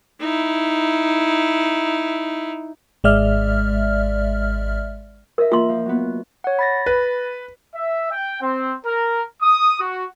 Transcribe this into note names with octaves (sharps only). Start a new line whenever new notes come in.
D#4 E4
G#1 G#3 D5 E5 F6
F4 A#4 D#5 E5
A#3 F4 C6
F3 F5
F#3 B3
C#5 F#5
B5 A6 A#6
B4
E5
G5
C4
A#4
D#6
F#4